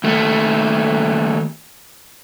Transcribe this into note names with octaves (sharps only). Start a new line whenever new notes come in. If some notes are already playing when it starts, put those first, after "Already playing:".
D#2 A3